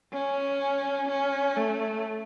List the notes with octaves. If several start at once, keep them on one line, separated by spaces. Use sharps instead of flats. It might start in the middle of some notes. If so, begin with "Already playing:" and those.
C#4
C#4
A3